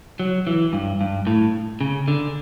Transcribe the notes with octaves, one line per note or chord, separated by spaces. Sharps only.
F#3
E3
G2
G2
A2
C#3
D3